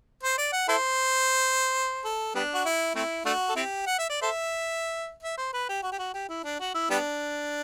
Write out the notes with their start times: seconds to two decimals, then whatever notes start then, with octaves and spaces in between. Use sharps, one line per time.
0.23 C5
0.38 D5
0.53 F#5
0.69 E4 A4 C5
2.05 A4
2.35 G3 B3 D4
2.55 F#4
2.66 E4
2.95 A3 C4 E4
3.25 A3 D4 F#4
3.49 A4
3.56 C4 E4 G4
3.87 F#5
3.99 E5
4.09 D5
4.22 A4 C5 E5
5.23 E5
5.38 C5
5.53 B4
5.69 G4
5.83 F#4
5.92 G4
5.99 F#4
6.14 G4
6.29 E4
6.44 D4
6.60 F#4
6.74 E4
6.90 G3 B3 D4